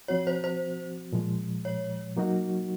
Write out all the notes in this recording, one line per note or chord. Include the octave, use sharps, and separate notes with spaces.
F3 C4 F#4 C#5
C5
C5
A#2 F3 G#3
C#5
F#3 A#3 D#4 F#4